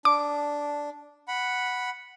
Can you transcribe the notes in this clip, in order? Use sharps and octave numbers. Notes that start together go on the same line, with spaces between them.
D4 D6
F#5 B5